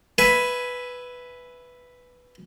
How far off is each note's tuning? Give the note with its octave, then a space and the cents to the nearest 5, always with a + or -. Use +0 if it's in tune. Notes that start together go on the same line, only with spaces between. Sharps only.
B4 +0 E5 +0 G#5 +5